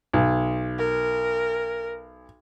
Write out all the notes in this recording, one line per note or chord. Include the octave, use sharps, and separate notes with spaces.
B1
A#4